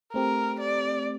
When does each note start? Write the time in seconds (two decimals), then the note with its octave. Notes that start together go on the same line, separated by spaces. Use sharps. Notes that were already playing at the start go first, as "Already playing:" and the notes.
0.14 A3 C4 G4 A#4
0.60 D5